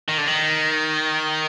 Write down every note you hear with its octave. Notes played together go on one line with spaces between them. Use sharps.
D#3
D3
D#3